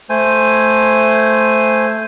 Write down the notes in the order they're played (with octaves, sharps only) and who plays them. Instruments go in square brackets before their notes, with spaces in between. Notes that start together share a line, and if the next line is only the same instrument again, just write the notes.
[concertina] A3 C5 G#5